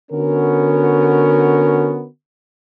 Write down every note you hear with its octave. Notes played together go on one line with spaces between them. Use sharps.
D3 B3 C#4 F#4 A#4